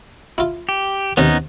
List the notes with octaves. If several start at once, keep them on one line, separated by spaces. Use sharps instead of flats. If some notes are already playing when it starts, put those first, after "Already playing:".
E4 F4
G4
D#2 C3 B3 C#4 D#4